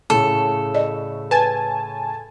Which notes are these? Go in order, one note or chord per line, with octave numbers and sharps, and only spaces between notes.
A2 C#3 A3 A4
D5 D#5
B4 G#5 A5